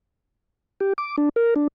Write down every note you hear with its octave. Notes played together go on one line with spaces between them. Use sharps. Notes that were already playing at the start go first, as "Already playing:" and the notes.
G4
D6
D4
A#4
D4